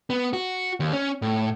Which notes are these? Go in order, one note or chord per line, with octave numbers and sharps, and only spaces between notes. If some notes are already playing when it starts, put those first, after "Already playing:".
B3
F#4
D#2
C#4
A2